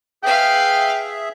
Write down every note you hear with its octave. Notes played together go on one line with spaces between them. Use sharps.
G#4 B4 E5 F5 G5